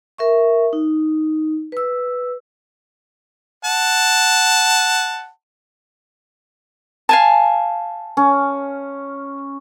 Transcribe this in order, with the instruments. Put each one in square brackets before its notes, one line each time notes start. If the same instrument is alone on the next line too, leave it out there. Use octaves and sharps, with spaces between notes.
[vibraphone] A#4 E5 C#6
D#4
B4 E6
[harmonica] F#5 A5
[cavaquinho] F5 G#5 A5
[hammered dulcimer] C#4